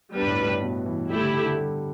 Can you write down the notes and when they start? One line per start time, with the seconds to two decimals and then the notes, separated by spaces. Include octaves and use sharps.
0.15 G3 B3 D4 B4
0.22 G2
0.27 A2
0.39 G2
0.51 A2
0.63 B2
0.86 E3
1.10 G3 A3 E4 G4
1.21 D3
1.33 D3
1.45 D3
1.57 G3